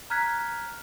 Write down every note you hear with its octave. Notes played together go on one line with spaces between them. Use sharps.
A#5 F6 F#6 G#6 B6